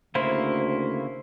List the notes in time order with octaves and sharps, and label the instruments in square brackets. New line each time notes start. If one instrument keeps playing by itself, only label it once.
[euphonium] D2 [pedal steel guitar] C#3 A#3 E4 [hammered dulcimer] C5